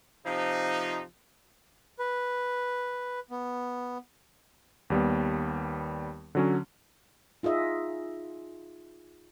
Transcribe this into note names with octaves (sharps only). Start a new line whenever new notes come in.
C3 F3 D#4
B4
B3
D#2 G3 B3
D3 F#3 C#4
D#4 F4 G#4 D#5 E5